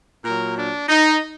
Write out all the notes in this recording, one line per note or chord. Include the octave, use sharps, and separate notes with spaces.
A#2 F#3 A#4
D4
D#4